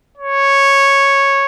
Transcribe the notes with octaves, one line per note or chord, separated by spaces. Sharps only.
C#5